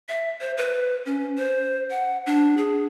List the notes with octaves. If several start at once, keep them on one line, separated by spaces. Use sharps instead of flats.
E5
C5
B4
C#4
C5
F#5
D4
G#4